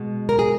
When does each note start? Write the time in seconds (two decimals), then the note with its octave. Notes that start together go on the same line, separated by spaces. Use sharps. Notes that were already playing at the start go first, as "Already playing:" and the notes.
Already playing: B2 G#3
0.29 A#4
0.39 G#4